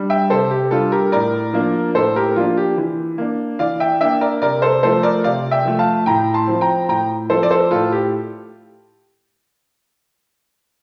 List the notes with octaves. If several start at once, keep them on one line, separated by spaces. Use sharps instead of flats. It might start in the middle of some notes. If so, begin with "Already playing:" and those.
Already playing: G3 D4
E5 G5
C3 A4 C5
G4
G3 D4 F4 A4
G4 A#4
A2 A#4 D5
F3 A#3 D4
A2 A4 C5
G4 A#4
F3 A#3 D4 F4
G4
E3
A#3 D4
E3 D5 F5
E5 G5
A#3 D4 E5 G5
A#4 D5
C3 A#4 D5
A4 C5
F3 A3 A4 C5
A#4 D5
C3 D5 F5
E5 G5
F3 A3
F5 A5
A2 G5 A#5
A5 C6
F3 C4
G5 A#5
A2 G5 A#5
F3 C4 A4 C5
D5
A4 C5
A2 F4 A4
G4